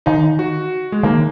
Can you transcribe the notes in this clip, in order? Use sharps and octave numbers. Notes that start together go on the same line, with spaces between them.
D#3 D#4
F#4
G#3
D#3 A#3